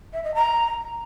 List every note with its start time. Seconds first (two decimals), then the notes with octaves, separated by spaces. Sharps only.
0.13 E5
0.23 D#5
0.34 A#5